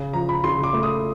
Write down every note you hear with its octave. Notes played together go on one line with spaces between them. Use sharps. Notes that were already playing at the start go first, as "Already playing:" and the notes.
Already playing: C#3
F3 A#5
B5
C#3 C6
D6
A3
D#6